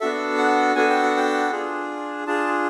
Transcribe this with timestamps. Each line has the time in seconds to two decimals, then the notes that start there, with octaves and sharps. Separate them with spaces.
0.01 B3 D4 F#4 A4 E5
0.38 F#5
0.76 B3 D4 F#4 A4 G#5
0.90 G5
1.03 F#5
1.17 G5
1.52 D4 F4 G#4
2.27 D4 F4 G#4 A5